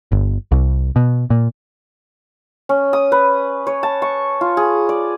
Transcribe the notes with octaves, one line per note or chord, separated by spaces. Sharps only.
G1
C2
B2
A#2
C#4
D#6
B4
C#5
A5
C#6
F4
G#4
D5